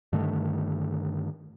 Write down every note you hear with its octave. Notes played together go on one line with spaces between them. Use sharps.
G2 D3 D#3 A3